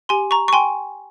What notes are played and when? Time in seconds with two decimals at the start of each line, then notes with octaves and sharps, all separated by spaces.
0.09 G4 G#5 C6
0.31 A#5 C#6
0.48 C#6
0.53 G5 G#5 C6